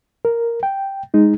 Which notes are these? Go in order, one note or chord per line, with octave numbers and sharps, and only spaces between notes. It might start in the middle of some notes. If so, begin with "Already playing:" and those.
A#4
G5
G#3 D#4 G#4